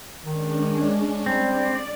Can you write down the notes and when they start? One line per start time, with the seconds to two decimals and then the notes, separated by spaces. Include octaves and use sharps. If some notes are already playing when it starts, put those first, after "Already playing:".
0.25 D#3 G#3 C#4 D4
1.26 G3 C4 D5